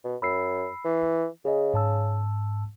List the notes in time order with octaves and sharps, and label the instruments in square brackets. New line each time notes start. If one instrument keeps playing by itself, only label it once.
[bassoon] B2
[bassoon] F#2 [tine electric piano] B5 E6 C7
[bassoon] E3
[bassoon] C#3 [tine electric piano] G#4 D#5
[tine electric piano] G#2 A5 E6